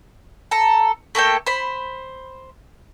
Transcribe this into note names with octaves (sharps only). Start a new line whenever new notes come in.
A4 A#5
A3 A#3 A4 G5
C5 B5